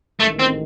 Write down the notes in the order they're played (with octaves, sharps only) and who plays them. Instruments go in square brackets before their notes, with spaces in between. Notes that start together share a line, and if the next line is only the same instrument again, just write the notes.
[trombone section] A1 G#2 D#3 [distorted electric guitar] A3
[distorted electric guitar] C4